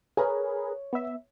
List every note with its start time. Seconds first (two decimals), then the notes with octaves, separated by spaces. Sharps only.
0.17 G#4 A#4 B4 C#5
0.93 B3 E5